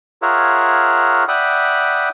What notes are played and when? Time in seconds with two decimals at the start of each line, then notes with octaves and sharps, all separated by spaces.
0.22 F4 G#4 A#4 C#5 E5 F#5
1.28 D5 E5 F#5 G5 B5 D#6